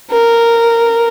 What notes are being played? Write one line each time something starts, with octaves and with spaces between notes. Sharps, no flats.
A#4